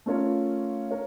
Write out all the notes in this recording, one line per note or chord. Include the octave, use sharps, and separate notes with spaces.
A3 C#4 F4 A#4 C#5
A#4 C#5